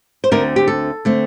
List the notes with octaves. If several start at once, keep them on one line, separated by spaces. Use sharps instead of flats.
C5
D2 D3 A3 C4 A#4
G4
A4
D3 A3 C4